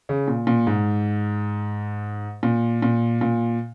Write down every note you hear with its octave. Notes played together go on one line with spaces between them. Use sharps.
C#3
A#2
A#2
G#2
A#2
A#2
A#2